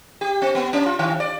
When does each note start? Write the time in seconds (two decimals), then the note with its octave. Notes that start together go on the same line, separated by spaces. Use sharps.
0.21 G4
0.42 C4
0.55 B3
0.73 C#4
0.86 F4
0.99 D#3
1.20 D5